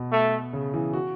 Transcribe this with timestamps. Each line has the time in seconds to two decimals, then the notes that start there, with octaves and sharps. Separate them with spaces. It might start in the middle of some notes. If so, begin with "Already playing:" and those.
Already playing: B2
0.12 A3
0.53 C#3
0.74 E3
0.93 F#4